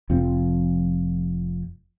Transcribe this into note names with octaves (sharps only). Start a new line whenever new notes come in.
F1 F2 F3 C4